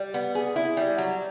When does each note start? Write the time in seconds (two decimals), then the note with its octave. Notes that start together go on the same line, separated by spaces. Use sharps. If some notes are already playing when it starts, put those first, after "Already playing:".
Already playing: G3
0.14 B3
0.35 G#4
0.56 E4
0.77 G3
0.98 F#3